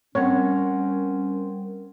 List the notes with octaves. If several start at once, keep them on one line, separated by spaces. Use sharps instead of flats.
G3 C4 C#4 A#4 C#5 F#5